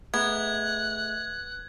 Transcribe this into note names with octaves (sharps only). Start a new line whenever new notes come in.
A3 B3 G#4 E5 F#6 G#6